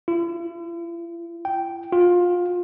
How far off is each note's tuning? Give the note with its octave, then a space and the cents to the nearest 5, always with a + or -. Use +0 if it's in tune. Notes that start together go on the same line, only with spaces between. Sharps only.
E4 +45
G5 -10
F4 +20